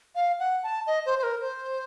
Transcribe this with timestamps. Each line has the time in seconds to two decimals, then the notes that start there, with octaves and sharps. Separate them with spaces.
0.15 F5
0.39 F#5
0.63 A5
0.87 D#5
1.06 C5
1.19 C5
1.23 A#4
1.41 C5